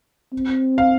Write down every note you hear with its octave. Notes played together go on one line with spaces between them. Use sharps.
C4
F5